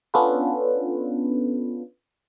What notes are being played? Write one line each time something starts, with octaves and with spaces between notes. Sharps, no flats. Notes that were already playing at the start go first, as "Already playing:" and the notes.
B3 C#4 D4 F4 A4 B4